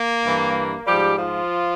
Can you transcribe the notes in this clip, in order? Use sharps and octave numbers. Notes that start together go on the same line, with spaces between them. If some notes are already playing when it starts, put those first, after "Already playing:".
Already playing: A#3
G2 E3
G#2 F3 G3 G4
F3 F4